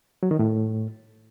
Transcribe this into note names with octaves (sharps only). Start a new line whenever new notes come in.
F#3
D#3
A2